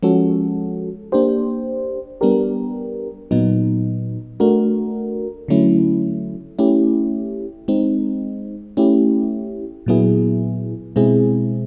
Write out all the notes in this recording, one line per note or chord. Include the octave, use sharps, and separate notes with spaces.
F3 G#3 C#4 F#4 A4
A#3 D4 G4 C5
G3 B3 D4 G4 A#4
A#2 F#3 B3 D#4
A3 D4 F#4 A#4
D3 F#3 A3 C#4 E4
A3 C#4 E4 G4
G#3 C4 D#4
A3 C#4 E4 G4
A#2 F#3 B3 E4 G#4
B2 G#3 C4 E4 G#4